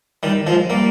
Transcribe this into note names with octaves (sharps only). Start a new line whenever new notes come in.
D#3 G3
F3 G#3
G3 A#3